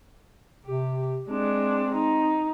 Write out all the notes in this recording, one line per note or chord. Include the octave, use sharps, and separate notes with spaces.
C3 G4
G#3 C4 D4
D#4